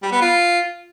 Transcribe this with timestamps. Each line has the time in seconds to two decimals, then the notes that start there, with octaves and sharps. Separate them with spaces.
0.02 G3
0.11 B3
0.21 F4